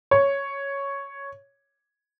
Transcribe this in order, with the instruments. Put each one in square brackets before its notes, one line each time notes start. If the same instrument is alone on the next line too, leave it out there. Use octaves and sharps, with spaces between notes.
[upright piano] C#5